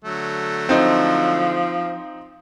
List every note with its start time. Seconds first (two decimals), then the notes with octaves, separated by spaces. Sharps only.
0.04 D3 F#3 A3
0.69 F3 C4 D#4